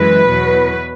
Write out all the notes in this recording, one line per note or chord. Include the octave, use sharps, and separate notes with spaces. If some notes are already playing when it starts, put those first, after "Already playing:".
Already playing: F#2 E3 G#3 B4
E2 B2 F#3